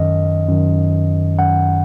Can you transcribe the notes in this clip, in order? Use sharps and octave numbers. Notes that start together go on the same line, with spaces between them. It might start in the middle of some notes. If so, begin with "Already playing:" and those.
Already playing: F#2 D#3 D#5
F#2 D#3
F#2 D#3 F#5